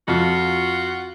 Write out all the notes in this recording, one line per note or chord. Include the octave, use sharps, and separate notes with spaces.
F2 F4 F#4